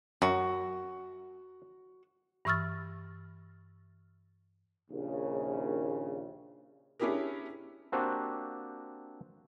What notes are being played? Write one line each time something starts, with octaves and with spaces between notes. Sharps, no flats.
F#2 F#4
G2 E3 C#6 E6 F6 A6
A#1 D#2 C#3
C#4 D4 E4 G4 G#4 A#4
A#3 C4 D4 F#4 G4